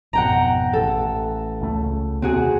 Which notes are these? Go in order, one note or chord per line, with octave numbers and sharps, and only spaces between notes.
G#1 F2 B2 F#5 G5 A#5
A1 A4
C#2 C#3 A3
D#2 C3 C4 F#4 G#4